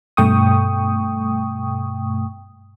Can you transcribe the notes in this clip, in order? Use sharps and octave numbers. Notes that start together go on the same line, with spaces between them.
G2 B2 A3 G5 C#6 D#6